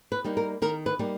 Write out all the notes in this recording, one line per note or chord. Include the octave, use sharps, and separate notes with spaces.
B4
G3 A#3 D#4
A#4
D#3 A#4
B4
G3 A#3 D#4